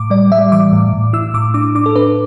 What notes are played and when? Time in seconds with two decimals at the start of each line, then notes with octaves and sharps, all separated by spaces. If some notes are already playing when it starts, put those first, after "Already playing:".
Already playing: A2 D6
0.10 G3 D5
0.31 G3 E5
0.52 E3 D6
0.72 A2
0.93 A2
1.13 E4 E6
1.34 A2 D6
1.54 D4 D6
1.75 D4 D6
1.86 A4
1.96 D4 B4